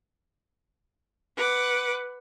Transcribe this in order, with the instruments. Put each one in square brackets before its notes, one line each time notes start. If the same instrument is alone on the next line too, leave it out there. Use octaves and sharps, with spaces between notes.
[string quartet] B4 F#5 D6